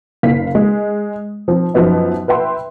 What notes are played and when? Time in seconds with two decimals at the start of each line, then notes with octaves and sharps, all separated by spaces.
0.23 F#1 F5 B6
0.55 G#3
1.48 F3 C4
1.74 F#2 F3 F#3 B3 D#4
2.28 B4 E5 G5 C6